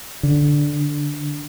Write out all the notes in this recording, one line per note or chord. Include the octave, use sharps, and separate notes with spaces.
D3